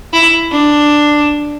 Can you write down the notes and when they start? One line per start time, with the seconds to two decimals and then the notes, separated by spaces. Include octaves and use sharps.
0.13 E4
0.52 D4